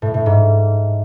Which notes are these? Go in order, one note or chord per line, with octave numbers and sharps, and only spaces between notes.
A2
A2
G#2